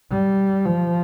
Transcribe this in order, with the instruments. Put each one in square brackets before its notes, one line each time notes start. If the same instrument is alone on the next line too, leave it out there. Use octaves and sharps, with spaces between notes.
[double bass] G3
F3